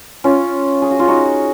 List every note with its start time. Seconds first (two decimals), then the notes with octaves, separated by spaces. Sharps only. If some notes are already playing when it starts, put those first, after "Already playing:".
0.24 C#4 F4
0.82 G#4
0.91 F#4
0.99 F4
1.08 D#4 F#4